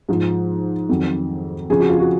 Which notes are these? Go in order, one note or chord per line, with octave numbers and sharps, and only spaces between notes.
G#2 F3
F2 D#3 F#3
F2 C#3 F3 G#4
F#4
F4
F#4